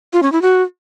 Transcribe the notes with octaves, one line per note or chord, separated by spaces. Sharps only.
F4
C#4
E4
F#4